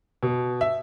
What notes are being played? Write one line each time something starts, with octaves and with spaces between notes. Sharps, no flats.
B2
E5